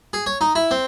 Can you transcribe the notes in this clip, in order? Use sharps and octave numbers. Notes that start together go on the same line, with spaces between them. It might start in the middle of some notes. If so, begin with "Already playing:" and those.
G#4
C#5
D#4
E4
C4